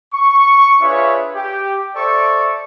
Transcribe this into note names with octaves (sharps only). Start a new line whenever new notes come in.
C#6
D4 F4 G#4 B4 C#5 E5
G4
A4 C5 D5 E5 A5 C#6